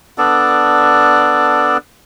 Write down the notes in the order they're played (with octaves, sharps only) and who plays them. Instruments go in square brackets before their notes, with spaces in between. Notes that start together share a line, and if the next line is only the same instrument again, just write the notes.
[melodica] B3 D4 A4 D5